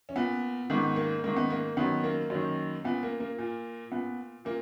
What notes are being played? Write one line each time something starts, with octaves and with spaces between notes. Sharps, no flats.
C#4
A#2 B3
G#2 D#3 B3
A#3
G#2 D#3 A#3
B3
A#3
F#2 D#3 B3
A#3
F#2 D#3
A#2 B3
A#3
A#3
A#2
A#2 B3
A#2 A#3